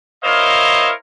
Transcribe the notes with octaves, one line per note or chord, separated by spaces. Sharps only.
E4 A#4 C5 C#5 D#5 F5